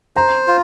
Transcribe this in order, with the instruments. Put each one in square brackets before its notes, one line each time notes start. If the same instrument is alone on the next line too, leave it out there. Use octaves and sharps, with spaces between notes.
[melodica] C5 [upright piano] A#5
[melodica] F4